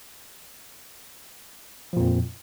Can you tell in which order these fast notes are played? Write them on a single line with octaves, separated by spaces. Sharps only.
F3 A#2 F2